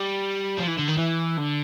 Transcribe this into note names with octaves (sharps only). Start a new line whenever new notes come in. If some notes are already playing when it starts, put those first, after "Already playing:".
Already playing: G3
F3
E3
D3
D#3
E3
D3